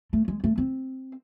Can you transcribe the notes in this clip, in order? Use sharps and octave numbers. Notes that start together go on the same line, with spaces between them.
A3
G#3
A3
C4